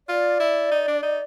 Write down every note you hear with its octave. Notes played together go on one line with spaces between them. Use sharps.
F4 D5
E4
D#4
D4
D#4